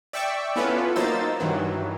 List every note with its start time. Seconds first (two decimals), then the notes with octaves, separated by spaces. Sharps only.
0.13 D5 E5 G5 C#6 D6 E6
0.56 B3 C#4 E4 F4 A4 B4
0.96 F#3 A#3 D#4 C5 E6 A6
1.40 G2 D#3 E3 F#3